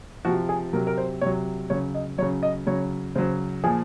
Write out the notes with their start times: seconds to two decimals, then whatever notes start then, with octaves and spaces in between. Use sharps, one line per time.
0.25 C3 F3 F#4
0.49 G#4
0.73 C3 F#3 A#4
0.87 A#4
0.98 C5
1.21 C3 F#3 C#5
1.70 C#3 F#3 C#5
1.95 D#5
2.18 F#3 C#5
2.22 C#3
2.43 D#5
2.66 C#3 F#3 C#5
3.15 C#3 F#3 C5
3.64 A#2 F3 G#4